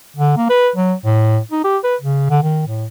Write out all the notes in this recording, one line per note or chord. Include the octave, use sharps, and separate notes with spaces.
D3
A#3
B4
F#3
A2
D#4
G4
B4
C#3
D3
D#3
A2